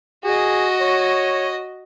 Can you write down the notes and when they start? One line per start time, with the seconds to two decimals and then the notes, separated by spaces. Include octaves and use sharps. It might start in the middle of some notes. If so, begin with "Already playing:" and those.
0.24 F#4 G#4 D#5
0.80 C#5